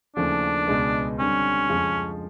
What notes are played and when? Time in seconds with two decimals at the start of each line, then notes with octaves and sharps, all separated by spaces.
0.16 D#2 C#3 F3 A3 D4
0.67 C#2 B2 G#3 B3
1.18 D3 G3 C4 C#4
1.70 F2 C#3 F3 G#3